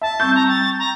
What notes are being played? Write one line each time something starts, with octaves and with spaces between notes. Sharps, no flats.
E5 A5
G3 C4 C#6 E6 G6
A#5
G5 A6
A#5